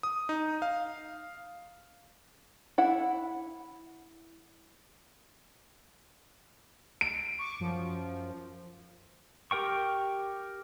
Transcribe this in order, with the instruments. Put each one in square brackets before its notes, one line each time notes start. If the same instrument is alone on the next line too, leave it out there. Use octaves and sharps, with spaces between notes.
[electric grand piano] D#6
D#4
F5
[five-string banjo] E4 F#5
[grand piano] D7
[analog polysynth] C#6 D6
F#2 F3
[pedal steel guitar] G4 A#4 G5 C#6